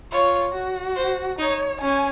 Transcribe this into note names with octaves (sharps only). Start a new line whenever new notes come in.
F4 C#5
F#4
C5
D#4 C#5
C#4 G#5